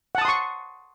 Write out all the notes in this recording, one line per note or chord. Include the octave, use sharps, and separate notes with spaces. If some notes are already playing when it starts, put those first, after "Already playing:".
F#5 A5 C6 C#6 D#6